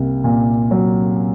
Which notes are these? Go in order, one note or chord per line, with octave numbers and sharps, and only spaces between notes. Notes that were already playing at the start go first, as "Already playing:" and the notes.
Already playing: C2 A#3
A#2
F#3